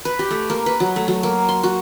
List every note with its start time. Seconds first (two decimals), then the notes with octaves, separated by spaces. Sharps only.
0.05 B4
0.19 G4
0.30 A3
0.50 A#3
0.66 B4
0.80 F#3
0.96 A3
1.08 F#3
1.23 A#3
1.49 C6
1.63 F#4